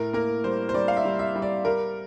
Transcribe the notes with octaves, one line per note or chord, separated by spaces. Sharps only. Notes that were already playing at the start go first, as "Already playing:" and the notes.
Already playing: A2 A#4
A#3 A#4
G3 C5
C5
G3 D5
F5
E5
G3
E5
G3
D5
G3 A#4